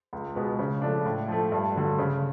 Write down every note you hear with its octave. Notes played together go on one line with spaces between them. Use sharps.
C#2
B2 G#3 B3
C#3
F3 A3 D4
A2
F3 A3
G2
D3 F#3
C#3